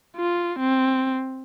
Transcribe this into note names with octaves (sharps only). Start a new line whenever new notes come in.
F4
C4